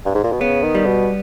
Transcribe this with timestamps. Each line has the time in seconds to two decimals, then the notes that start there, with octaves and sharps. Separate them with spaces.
0.06 G2
0.15 G#2
0.24 A#2
0.32 B2
0.41 C#3 B3
0.63 D#3
0.75 G3
0.86 B2